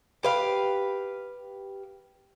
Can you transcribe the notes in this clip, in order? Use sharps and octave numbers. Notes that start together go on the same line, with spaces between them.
G4 B4 F5